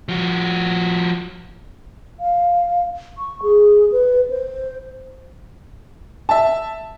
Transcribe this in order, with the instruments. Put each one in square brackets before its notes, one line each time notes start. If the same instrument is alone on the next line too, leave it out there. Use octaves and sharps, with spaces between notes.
[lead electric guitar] F3 F#4
[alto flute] F5
C#6
G#4
B4
C5
[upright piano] E5 A5